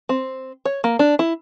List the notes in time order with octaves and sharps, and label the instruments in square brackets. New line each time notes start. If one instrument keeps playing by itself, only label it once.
[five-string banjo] C4
C#5
A#3
D4
E4